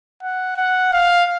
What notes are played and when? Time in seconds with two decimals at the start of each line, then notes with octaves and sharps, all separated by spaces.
0.23 F#5
0.57 F#5
0.93 F5